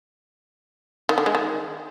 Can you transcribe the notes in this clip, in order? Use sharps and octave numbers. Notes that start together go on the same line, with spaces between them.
D#3
D3
G#3
D#3